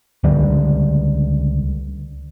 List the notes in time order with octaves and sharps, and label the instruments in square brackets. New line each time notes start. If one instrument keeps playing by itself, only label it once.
[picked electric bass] C#2 D3 G3